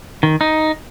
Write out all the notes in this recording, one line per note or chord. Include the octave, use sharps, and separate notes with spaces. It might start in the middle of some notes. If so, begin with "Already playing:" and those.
D#3
D#4